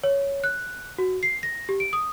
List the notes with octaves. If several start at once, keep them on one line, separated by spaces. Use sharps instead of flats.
C#5
F#6
F#4
C7
A#6
G4
D7
D#6